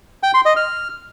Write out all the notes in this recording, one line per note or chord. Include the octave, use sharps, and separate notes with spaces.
G5
C6
D#5
F6